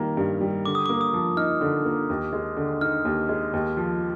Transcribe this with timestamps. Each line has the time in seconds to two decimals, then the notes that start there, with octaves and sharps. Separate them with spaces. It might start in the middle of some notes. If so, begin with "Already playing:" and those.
Already playing: D#3 G3 A#3 A#5
0.17 G2
0.41 G3
0.65 D3 D6
0.75 D#6
0.86 A#3 D6
1.01 D#6
1.13 F3
1.37 D#4 F6
1.61 D3
1.85 A#3
2.10 D#2
2.33 G#3
2.57 D3
2.81 D#4 F6
3.05 D#2
3.29 G#3
3.53 D#2
3.77 F3